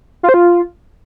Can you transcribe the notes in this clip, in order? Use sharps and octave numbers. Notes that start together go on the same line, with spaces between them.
F4
C5
F4